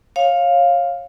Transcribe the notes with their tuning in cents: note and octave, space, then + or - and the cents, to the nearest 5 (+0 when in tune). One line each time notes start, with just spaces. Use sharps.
C#5 -25 F5 +5